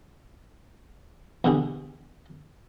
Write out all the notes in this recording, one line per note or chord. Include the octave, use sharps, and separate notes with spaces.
E2 B2 D3 G4 G#4